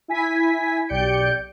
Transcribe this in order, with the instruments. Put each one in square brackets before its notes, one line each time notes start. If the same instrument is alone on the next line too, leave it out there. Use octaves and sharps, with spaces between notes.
[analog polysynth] E4 G#5 B6
B1 G4 D5 G6 C#7 D7